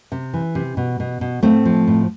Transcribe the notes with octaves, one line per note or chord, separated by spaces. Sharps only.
C3
E3
C3
B2
B2
B2
A2 A3 C4
F3
A2